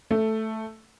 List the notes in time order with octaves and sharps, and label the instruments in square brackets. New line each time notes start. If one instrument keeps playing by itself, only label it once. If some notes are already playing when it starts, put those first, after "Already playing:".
[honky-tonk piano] A3